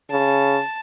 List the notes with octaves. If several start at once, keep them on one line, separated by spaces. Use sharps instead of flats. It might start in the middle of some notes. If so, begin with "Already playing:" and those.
C#3 A5